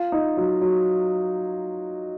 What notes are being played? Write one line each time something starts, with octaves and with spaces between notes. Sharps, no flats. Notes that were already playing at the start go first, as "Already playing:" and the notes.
Already playing: F4
D#4
F#3
F#3